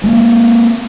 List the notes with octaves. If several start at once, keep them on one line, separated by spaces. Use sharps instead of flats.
G#3 A#3